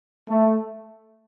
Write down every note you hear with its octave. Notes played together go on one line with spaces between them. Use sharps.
A3